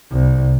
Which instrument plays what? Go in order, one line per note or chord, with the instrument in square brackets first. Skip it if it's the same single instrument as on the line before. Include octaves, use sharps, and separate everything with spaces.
[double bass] C2